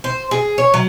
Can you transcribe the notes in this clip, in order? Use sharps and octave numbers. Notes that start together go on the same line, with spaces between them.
C5
G#4
C#5
F#3